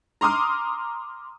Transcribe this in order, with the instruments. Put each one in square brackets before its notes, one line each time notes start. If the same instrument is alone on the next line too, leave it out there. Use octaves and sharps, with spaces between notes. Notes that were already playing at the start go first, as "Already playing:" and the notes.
[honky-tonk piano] A#5 C6 D6 D#6 F6